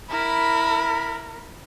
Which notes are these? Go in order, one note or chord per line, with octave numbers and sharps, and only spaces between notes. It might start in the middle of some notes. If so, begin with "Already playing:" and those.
E4 A#4 B5